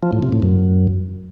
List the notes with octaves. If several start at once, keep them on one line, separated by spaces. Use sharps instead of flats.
F3
A2
C3
A2
F#2